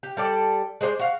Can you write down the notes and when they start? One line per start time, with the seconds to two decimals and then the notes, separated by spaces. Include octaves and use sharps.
0.03 G4
0.17 G3 A4 D5
0.81 G#3 G#4 C5 D5
0.99 F#4 F5